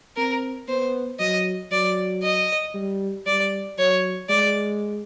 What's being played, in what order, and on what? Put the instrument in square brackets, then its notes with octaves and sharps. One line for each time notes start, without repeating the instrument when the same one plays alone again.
[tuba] C4 [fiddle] A#4
[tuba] B3 [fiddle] C5
[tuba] F#3 [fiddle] D#5
[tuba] F#3 [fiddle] D5
[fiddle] D#5
[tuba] G3
[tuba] G3 [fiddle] D5
[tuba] F#3 [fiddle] C#5
[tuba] G#3 [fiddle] D5